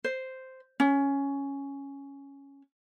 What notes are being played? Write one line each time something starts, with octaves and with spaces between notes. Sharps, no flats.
C5
C#4